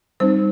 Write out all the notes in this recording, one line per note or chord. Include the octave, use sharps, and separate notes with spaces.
G3 C4 D#4 C5